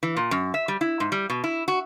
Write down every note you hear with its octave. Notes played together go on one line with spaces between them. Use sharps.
E3
A#2
F#2
E5
G3
E4
G#2
G3
B2
E4
F#4